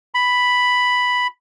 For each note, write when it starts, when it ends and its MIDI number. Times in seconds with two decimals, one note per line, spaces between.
0.14 1.27 83